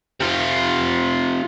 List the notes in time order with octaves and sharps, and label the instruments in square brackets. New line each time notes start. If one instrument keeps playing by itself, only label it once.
[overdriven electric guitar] C3 F4